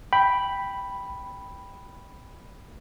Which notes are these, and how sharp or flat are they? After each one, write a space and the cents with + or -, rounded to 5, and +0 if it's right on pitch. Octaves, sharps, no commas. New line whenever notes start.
G5 +0 B5 +0